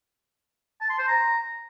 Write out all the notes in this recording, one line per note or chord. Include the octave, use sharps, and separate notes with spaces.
A5
C6
C5
A#5